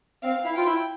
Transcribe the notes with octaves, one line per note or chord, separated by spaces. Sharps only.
C4 F5
E4
F4 G5
E4